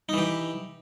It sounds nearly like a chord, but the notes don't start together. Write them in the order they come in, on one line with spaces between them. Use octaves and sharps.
D#4 E3 G4